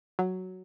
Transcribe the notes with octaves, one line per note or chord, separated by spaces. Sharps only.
F#3